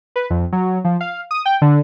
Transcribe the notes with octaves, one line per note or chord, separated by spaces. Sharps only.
B4
F2
F#3
F3
F5
D#6
G5
D3